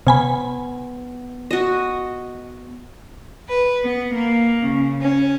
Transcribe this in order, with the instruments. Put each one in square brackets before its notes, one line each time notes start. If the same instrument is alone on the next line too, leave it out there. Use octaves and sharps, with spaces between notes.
[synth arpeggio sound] C3 G#5 B5 [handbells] B3
[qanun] F#4 D#5
[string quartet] B4
B3
A#3
C#3
C#4